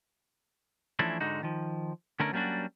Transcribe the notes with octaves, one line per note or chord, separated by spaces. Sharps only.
E3 F3 A3 C#4 D4 E4
G#2 D3 G#3 D#4 F#4
D#3 F3
D3 A3 B3 C#4 E4 A#4
F#3 G3 A#3 C#4 D4 F#4